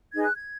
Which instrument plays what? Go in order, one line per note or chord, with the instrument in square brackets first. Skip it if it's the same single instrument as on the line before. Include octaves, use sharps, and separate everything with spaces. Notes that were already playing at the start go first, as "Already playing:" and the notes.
[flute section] D#4 G#4 B4 G#6
F#6
G#6